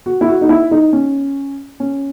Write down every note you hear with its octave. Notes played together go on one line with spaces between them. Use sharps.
F#4
E4
F#4
D#4
E4
D#4
C#4
C#4